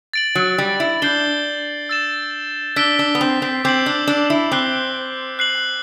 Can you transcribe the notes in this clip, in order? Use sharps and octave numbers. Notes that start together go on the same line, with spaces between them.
A6 D7 F#7
F#3
G3
E4
D4 G6 C7 G7
E6 A6 E7
D4 E6 B6 D7 G7
D4
B3
C4
C4
C4 D6 G6 C7 F#7
D4
D4
E4
C4 D6 F#6 C7 G7
F#6 C7 F#7